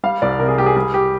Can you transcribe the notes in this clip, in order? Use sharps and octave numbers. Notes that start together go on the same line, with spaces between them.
G3 F5
C2 D5
C3 A#4
G#4
C2 G4
G#4
G3 G#4
G4